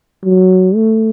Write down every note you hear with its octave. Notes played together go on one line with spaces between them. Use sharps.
F#3
A3